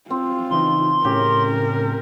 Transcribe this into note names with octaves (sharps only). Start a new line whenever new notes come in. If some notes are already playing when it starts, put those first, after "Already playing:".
C4 F4
C#3 E3 D#4 C6
A2 C#3 C#4 G4 A#4